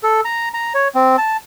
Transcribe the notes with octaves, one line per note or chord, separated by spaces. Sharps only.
A4
A#5
A#5
C#5
C4
A5